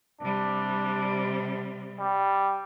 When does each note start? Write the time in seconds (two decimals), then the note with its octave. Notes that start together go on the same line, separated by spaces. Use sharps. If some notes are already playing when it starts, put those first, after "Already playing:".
0.21 C3 G3 D4
2.00 G3